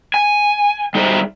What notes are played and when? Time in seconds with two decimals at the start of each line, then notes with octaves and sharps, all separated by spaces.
0.14 G#5
0.95 G3 D#4 G#4 C5 D5 E5